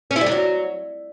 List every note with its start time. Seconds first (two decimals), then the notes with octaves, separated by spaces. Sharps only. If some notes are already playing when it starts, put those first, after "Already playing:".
0.11 C#4
0.16 E4
0.21 G3
0.26 D4
0.32 F#3